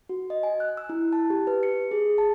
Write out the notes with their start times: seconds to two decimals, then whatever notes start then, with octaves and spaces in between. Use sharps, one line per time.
0.09 F#4
0.30 D#5
0.43 G#5
0.60 F#6
0.77 E6
0.89 E4
1.13 A5
1.30 G4
1.47 B4
1.63 C#7
1.91 G#4
2.18 A5